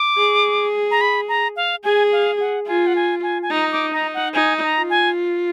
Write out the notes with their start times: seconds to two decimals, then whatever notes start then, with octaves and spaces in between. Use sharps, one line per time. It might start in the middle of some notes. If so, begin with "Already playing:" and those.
Already playing: D6
0.17 G#4
0.91 A#5
1.01 B5
1.28 A#5
1.56 F5
1.84 G#4 G#5
2.12 F5
2.40 F#5
2.67 F4 G#5
2.87 F#5
2.96 G#5
3.23 G#5
3.42 G#5
3.51 D#4 A#5
3.72 D6
3.92 D#4 A#5
4.14 F#5
4.34 D#4 G#5
4.63 A#5
4.76 F4
4.90 G#5